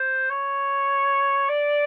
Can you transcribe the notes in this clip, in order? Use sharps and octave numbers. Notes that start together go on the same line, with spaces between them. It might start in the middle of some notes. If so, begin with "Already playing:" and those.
Already playing: C5
C#5
D5